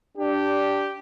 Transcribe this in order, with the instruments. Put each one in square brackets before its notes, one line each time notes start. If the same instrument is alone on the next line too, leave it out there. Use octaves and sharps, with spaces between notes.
[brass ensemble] D4 G4